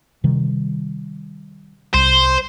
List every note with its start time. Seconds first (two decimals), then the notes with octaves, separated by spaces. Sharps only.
0.24 C3 D#3 G3
1.94 C2 C5